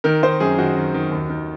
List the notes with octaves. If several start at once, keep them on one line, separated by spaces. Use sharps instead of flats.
D#3 A#4
D#3 C5
F#2 G#4
D#3 F#4
D#3
D#3
D#2
D#3